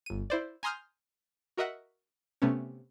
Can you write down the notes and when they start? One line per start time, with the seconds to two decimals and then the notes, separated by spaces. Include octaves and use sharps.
0.06 G1 D#7
0.30 E4 C5 D5
0.63 G#5 A#5 C6 D#6 F6 G6
1.57 F#4 A#4 D#5 E5 F#5
2.42 C3 A3 B3 C#4